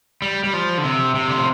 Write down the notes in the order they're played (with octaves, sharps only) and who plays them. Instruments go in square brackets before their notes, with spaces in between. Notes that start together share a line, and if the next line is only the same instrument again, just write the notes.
[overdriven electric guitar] G3
G3
F3
D3
C3
C3
D3
F3